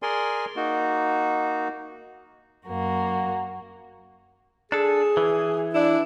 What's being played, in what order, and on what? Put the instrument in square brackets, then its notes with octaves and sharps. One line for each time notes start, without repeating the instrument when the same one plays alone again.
[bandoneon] G#4 A#4 D5 G#5 C6
A#3 D#4 F#4
[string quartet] F#2 A#3 F#4
[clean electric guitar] D4 A4 [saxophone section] G#4
[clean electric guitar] E3
[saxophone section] D4 E4